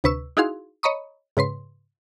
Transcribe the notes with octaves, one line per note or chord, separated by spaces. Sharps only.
D2 C3 B4 C#6 E6
D#4 E4 F#4 G#4 F5 C6
C#5 D#5 A#5 B5 C#6 D#6
G#2 C#3 B4 C6